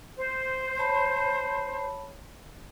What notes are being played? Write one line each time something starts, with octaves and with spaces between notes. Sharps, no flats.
C5
C#5 A5 B5